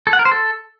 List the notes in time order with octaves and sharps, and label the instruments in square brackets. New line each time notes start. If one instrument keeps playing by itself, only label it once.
[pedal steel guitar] A4
F#5
A#4
C5
A4